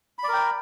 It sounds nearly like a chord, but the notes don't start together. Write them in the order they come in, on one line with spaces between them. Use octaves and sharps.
B5 D5 A#4 G5